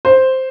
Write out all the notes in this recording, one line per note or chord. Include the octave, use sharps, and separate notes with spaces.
C5